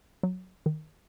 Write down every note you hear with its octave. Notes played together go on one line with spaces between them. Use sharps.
F#3
D#3